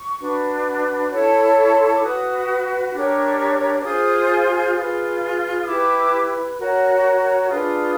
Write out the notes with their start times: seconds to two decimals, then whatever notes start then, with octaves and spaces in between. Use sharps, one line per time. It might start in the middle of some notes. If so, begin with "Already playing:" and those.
Already playing: C#6
0.20 D4 F#4 B4
1.11 E4 A4 C#5
1.66 B5
1.75 C6
1.84 C#6
1.94 D6
2.02 F#4 B4 D#6
2.93 D4 G4 A#4 C#5
3.80 D6
3.84 F4 G#4 C5 D#6
4.75 F4 G#4 B4
5.61 D#6
5.67 E4 G4 B4 D6
6.58 F#4 A#4 C#5
7.49 D4 F4 G#4 B4 D#6